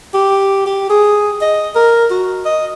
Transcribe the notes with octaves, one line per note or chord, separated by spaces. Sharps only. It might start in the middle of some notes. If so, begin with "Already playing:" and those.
G4
G4
G#4
D#5
A#4
F#4
D#5